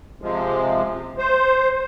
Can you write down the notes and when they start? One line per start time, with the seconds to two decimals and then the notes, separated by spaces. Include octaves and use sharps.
0.22 C3 F3 G#3
1.18 C5